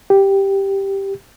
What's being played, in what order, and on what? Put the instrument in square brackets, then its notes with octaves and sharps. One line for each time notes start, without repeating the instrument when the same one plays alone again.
[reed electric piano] G4